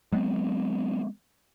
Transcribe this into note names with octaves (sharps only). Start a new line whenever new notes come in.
F#3 G#3 B3 C4